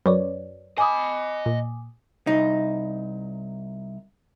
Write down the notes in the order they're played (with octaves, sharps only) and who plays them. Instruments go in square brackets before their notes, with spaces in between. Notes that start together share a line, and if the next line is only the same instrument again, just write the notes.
[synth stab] F#2 [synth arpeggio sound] B4 C#5 D5
[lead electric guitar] D#5 B5 [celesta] G#5 D6 D#6
[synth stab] A#2
[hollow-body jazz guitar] C2 D#4